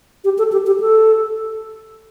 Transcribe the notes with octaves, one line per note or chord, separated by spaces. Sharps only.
G4
A4
G4
G4
A4